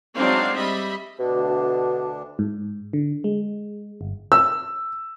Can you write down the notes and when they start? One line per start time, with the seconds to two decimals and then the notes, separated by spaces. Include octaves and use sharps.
0.17 F#3 G#3 C4 D4 D#4 F5
0.55 G3 D#5 E5 B5
1.19 D2 B2 D4
2.39 G#2
2.93 D3
3.24 G#3
4.01 G1
4.32 E6